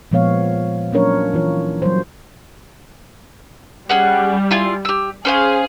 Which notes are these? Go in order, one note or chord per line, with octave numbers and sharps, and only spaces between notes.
A#2 F3 G#3 B3 C#5 F5
F#3 A#3 C#4 D4 A#4 C#5
E3 F4 C#5
F#3 G3 C5
G3 C#4 G#4 F#5
E4 F4 G#4
G4 E6
C#4 G#4 C5 F5